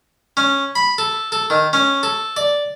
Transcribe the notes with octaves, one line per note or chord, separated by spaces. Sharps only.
C#4
B5
A4
A4
D#3
C#4
A4
D5